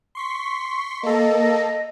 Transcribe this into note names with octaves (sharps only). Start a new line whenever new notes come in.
C6 C#6 B6
A#3 A4 D#5